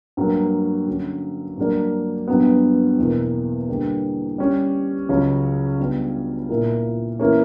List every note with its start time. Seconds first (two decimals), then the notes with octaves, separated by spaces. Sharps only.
0.17 G2 F#3 A#3
0.88 D3 F#3 C#4
1.57 G2 F#3 A#3 D4
2.28 G2 F#3 B3
2.99 E2 B2 A#3
3.69 D3 G3 A#3
4.38 G3 C#4 G4
5.09 C#2 C#3 F#3 C#4
5.79 G3 B3 D4 F#4 B4
6.49 A#2 A#3 E4
7.19 E3 A#3 C#4